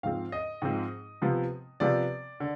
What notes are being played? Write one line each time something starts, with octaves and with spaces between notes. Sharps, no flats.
G#2 F3 C4 F5
D#5
G#2 F3 C4
C3 F3 B3
C3 F3 B3 D5
D3